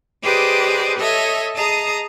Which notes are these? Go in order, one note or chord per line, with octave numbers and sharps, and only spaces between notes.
G4 G#4 B4 C5 D5 D#5
A4 C#5 D#5 E5
G#4 D#5 A5 A#5 D#6